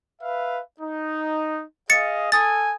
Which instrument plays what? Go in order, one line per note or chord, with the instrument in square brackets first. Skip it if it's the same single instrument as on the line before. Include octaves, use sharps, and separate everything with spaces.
[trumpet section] B4 E5 F5
D#4
[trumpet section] G#4 D#5 F5 [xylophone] A6 C#7
[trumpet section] A4 G#5 [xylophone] D#6 A6